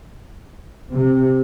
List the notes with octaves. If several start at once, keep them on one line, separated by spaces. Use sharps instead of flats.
C3